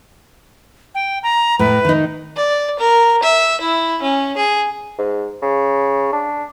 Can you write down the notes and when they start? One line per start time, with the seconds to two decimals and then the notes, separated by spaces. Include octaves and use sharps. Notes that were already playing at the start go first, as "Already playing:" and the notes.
0.95 G5
1.23 A#5
1.59 A2 B4
1.85 D#3 D#4
2.36 D5
2.79 A#4
3.23 E5
3.61 E4
4.02 C#4
4.37 G#4
4.99 G#2
5.42 C#3
6.13 D4